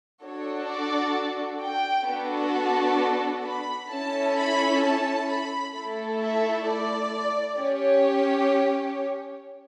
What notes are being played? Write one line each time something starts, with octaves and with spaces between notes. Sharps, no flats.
D4 F#4 A4 C#5
D5
G5
B3 D4 F#4 A4
B5
C#4 E4 A4 A5
B5
A5
B5
A3 E4 A4
E5
D5
C#4 G4 C#5